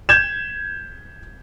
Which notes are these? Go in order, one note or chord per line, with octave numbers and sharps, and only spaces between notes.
G6 G#6 E7